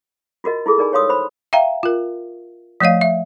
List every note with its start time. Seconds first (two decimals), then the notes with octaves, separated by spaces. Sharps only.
0.44 F4 F#4 A#4 D#5
0.66 E4 F4 G#4 A4 C#6
0.78 D#4 A#4 D5 G#5 B5
0.92 G4 C#5 F5 C6 D#6 E6
1.09 C5 B5
1.53 E5 F5 G5 A#5
1.83 F4 A#4
2.80 F3 A3 C#5 D#5 F5
3.01 E5